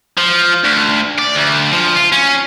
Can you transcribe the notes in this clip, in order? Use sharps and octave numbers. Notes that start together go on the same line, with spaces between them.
F3
D2
D5
D2
F3
F4
C#4